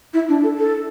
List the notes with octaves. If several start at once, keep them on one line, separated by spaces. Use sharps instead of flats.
E4
D4
A4
A4